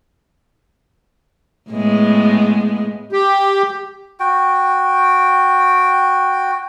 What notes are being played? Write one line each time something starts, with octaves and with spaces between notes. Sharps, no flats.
A2 G#3 B3
G4
F#4 G5